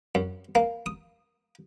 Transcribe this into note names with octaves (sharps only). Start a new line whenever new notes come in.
F#2
A#3
D#6